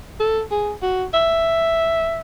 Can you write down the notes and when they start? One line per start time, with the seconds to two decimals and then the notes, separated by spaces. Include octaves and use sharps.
0.20 A4
0.51 G#4
0.82 F#4
1.14 E5